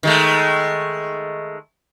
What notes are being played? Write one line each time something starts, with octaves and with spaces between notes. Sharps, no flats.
D#3 G#3 A3